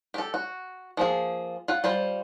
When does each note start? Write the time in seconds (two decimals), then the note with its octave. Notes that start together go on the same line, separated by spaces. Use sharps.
0.14 G4 A4
0.34 F#4
0.97 F3 A#3 G#4
1.68 F4 F#5
1.84 G3 F4 C5